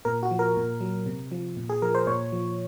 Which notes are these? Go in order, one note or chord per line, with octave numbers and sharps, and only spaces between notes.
A#2 A#4
F#4
F3
A#4
A#2
F#3
C3
F3
A#2
G#4
F3 A#4
C5
A#2 C#5
F3